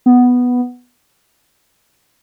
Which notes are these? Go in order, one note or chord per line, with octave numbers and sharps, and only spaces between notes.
B3